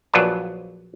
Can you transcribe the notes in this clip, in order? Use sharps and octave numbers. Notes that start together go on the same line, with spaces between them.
A#1 F#3 F4 B4 D5 A5